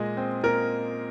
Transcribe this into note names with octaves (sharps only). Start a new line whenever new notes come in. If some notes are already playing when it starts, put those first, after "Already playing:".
Already playing: A#2 G#3 D#5
C4
A#2 A#4